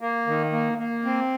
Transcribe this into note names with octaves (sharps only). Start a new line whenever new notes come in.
A#3
D#3
A#3
A#3
C4